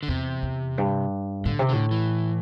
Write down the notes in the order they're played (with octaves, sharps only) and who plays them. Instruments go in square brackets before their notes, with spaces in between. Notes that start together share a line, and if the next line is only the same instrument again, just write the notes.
[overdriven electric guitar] D3
[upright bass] E2 [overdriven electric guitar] C3
[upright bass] E2
G2
[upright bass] A2 [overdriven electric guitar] D3
[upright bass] C3
[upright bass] A2 [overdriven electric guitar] D3
[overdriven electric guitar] E3